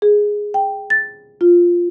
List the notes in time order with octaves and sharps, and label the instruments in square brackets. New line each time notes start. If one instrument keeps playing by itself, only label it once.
[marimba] G#4
G5
A6
F4